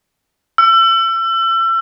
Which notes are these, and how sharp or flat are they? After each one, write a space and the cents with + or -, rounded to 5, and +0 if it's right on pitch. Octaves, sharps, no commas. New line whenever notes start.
E6 +35